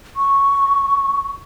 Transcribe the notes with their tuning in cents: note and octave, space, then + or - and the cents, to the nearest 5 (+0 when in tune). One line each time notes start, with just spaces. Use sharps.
C#6 +5